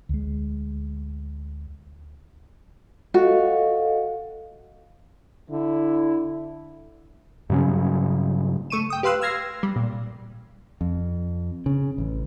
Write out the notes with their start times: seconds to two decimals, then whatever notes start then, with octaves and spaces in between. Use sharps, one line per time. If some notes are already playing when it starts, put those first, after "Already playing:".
0.09 D2 G#3
3.14 F#4 A4 D#5 F5
5.50 D3 E4
7.50 G2 C#3 F#3 C#4
8.70 A3 C#6 D#7 E7
8.90 G5 D#6
9.03 G4 B4 F5 C6 E6 F#6
9.21 E6 F6 G#6 A#6 C7
9.63 G3
9.76 A#2
10.81 F2
11.66 C#3
11.98 A1